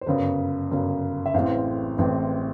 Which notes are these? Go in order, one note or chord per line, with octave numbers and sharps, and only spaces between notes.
C5
G1 F#2 C#3 B4
G1 F#2 C#3
E5
A1 A2 E3 G#3 C4 F5
A1 A2 E3 G#3 C4